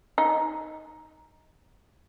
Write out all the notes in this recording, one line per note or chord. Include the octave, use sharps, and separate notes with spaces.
D#4